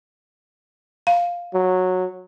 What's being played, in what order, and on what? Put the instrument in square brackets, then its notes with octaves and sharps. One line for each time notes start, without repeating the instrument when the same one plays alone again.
[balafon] F5
[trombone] F#3